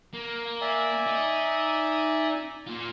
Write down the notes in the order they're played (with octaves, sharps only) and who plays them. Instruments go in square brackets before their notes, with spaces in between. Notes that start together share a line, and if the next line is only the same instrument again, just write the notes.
[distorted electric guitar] A#3
[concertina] D5 E5 G#5
[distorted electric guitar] D#4
A#3 F4